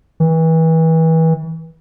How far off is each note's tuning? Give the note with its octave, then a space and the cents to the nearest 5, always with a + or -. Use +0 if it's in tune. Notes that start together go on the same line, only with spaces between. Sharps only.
E3 -30